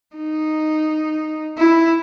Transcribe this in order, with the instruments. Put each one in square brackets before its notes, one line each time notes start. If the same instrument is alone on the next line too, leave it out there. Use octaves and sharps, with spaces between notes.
[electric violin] D#4
E4